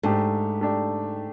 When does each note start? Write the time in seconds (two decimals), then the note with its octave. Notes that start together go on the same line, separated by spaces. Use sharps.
0.03 G#2 A3 D4 G4
0.61 A3 D4 G4